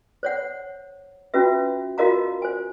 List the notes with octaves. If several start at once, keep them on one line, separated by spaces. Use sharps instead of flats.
C5 C#5 F#5
C#4 F4 F#4 B4 E5
F4 F#4 A#4 D#5 F5 A#5
C5 G#5